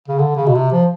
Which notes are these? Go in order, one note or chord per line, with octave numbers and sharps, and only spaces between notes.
C#3
D3
C#3
B2
C3
F3